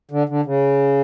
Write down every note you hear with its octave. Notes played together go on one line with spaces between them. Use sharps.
D3
D3
C#3